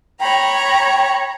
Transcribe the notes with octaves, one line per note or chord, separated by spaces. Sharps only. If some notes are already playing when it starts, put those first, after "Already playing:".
C#5 G5 A#5 B5